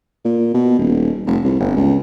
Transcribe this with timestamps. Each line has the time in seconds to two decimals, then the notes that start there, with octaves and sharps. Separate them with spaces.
0.25 A#2
0.54 B2
0.78 D#1
1.26 F1
1.44 C2
1.59 G1
1.76 C#2